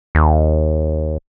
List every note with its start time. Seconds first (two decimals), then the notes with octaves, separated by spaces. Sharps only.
0.15 D#2